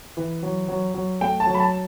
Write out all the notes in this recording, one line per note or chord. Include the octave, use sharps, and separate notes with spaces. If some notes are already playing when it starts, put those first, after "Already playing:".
E3
F#3
F#3
F#3
A3 G5
A5
F#3
B5
A5